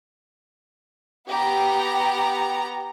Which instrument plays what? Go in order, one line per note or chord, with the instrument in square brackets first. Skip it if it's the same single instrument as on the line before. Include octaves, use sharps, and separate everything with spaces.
[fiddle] B3 A#5 [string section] G4